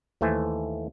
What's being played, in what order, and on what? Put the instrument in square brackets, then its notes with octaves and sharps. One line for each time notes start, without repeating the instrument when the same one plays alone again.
[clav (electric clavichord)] D#2 E3 A3 C5 G#5